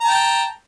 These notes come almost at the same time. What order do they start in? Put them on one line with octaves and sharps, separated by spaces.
A#5 A5 G5